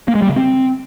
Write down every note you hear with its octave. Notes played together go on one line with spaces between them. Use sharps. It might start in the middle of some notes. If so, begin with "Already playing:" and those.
A#3
G#3
G3
C#3
C4